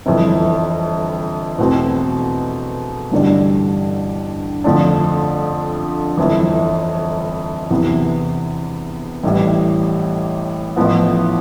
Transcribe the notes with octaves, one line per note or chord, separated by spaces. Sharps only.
G1 F2 E3
E2 B2 A3 C4
A1 G2 D3 G3 D4
F2 D3 F3 A3 D4
G1 F2 E3
E2 C3 E3 B3
A1 A2 E3 G3
A1 A2 F3 B3